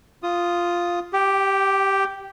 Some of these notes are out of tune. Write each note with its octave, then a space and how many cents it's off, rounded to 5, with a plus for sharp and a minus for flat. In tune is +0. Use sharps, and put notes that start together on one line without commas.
F4 +0 D#6 +0
G4 +0 G5 -35